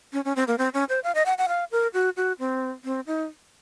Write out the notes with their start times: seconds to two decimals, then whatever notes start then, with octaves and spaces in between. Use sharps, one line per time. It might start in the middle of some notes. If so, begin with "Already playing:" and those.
0.13 C#4
0.25 C#4
0.36 C4
0.48 A#3
0.58 C4
0.74 C#4
0.89 C5
1.04 F5
1.15 D#5
1.26 F#5
1.38 F#5
1.48 F5
1.72 A#4
1.94 F#4
2.17 F#4
2.39 C4
2.85 C4
3.07 D#4